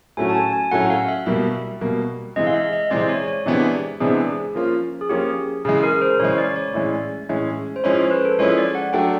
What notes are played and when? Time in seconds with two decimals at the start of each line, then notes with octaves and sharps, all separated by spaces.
0.17 A2 F#3 A3 C#4 F#4 G#5
0.29 A5
0.35 G#5
0.53 G#5
0.71 A2 F#3 A3 C#4 F#4 F#5
0.90 F5
1.08 E5
1.26 B2 G3 A#3 E5
1.81 B2 G3 A#3
2.36 C3 E3 G#3 C4 D#5
2.47 F5
2.54 E5
2.73 D#5
2.90 C3 E3 G#3 C4 D5
3.01 D5
3.09 C#5
3.28 C#5
3.46 C3 E3 G#3 B3 D4 G4
4.00 C3 E3 G#3 B3 D4 G#4
4.55 F3 A#3 C#4 F4
5.01 G#4
5.09 F3 A#3 C#4 F4 G4
5.65 C#3 E3 G#3 G#4
5.83 A#4
6.01 C5
6.19 C#3 E3 G#3 C#5
6.38 D5
6.51 D5
6.56 C#5
6.74 A2 E3 G#3 C#4
7.29 A2 E3 G#3 C#4
7.76 C5
7.84 F3 G#3 C#4 E4 C#5
7.98 C5
8.11 B4
8.25 A4
8.39 F3 G#3 C#4 E4 C#5
8.58 D5
8.75 F#5
8.93 F#3 A3 D4 G5